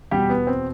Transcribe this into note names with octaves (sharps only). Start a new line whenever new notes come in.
E2 B2 G3 G4
B3
C4